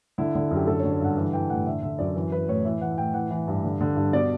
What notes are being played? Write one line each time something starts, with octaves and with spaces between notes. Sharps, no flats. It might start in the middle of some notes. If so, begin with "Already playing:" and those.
D3 E4
D3
F#2
G4
D3 A4
C#5
D3
C#5
G2 F#5
E3 F#5
E3 G5
A2 F#5
D3 E5
D3 E5
F#2 D5
E3
E3 B4
A2 C#5
E3 E5
E3 F#5
A2 G5
E3 F#5
E3
G2
D3
D3
G2
B2 D5